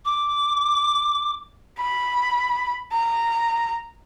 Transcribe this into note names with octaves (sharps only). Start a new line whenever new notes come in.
D6
B5
A#5